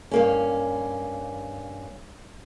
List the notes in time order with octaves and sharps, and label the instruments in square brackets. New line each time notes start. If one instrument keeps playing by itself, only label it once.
[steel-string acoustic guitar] G2 A#3 C#4